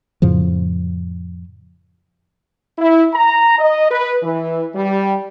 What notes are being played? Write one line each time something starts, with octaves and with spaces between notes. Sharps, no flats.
F2 A2 C#3 F3
E4
A#5
D#5
B4
E3
G3